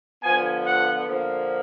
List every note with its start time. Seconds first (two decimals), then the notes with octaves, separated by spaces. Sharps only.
0.23 D3 F3 B3 G#5
0.64 F#5
1.06 D3 F3 A#3